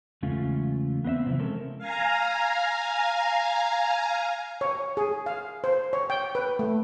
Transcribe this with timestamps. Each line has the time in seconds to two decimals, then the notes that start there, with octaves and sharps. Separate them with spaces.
0.22 E2 C#3 G#3 A3 C#4 F4
1.04 B3 C4 D#5 E5
1.26 C3 E3 F3
1.39 G#3 C4 C#4 A4 A#4
1.78 F5 G#5 A#5
4.61 C#5
4.97 G#4
5.26 F5
5.64 C5
5.93 C#5
6.10 G5
6.35 B4
6.59 A3